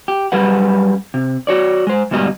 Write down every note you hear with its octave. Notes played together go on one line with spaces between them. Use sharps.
G4
F#2 G3 G#4 B4 F#5
C3
F#4 C#5 D5
G#3 C5
D2 G#2 B2 G3 D#5